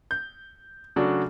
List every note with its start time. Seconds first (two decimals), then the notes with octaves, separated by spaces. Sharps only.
0.11 G6
0.96 C#3 F#3 A3 D4 F#4